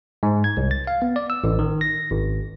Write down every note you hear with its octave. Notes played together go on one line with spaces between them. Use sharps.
G#2
G#6
C2
A6
F5
B3
D5
E6
A1
D#3
A#6
G#1